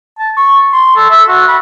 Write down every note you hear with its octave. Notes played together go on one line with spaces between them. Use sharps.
A5
C#6
C6
A4
E5
F#4
B5